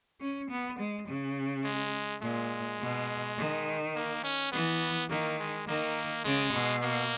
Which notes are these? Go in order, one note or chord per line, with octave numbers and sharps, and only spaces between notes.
C#4
B3
G#3
C#3
G#3
A#2 G#3
B2
D#3
A#3
C#4
E3 B3
D#3 A#3
G#3
D#3 A#3
C#3 G#3
B2
A#3